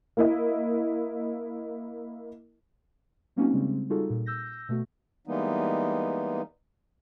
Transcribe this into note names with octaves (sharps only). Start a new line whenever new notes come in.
A#3 E4 D#5
F#3 A#3 C4 C#4 D#4 F#4
C#3 G3 G#3 C4
G3 D#4 F4 F#4 G#4 A4
A#2
E6 G6 A#6
B2 A3 F#4
E3 G3 G#3 A#3 B3 D#4